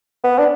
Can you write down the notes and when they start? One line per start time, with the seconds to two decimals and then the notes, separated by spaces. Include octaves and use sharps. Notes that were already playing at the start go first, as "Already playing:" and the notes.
0.24 B3
0.38 D4